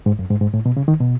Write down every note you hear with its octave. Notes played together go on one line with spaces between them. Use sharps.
G#2
F#2
G#2
G#2
A2
B2
C#3
D#3
B2